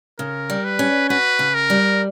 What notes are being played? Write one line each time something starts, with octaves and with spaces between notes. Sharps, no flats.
C#3 A#4
G3
B4
C#4
F#4 B4
C#3
A#4
G3